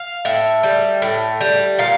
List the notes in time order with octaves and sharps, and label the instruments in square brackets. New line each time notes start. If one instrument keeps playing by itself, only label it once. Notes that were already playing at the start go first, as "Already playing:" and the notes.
Already playing: [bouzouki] F5
A2 E5
G3
A2
G3
A#2 F5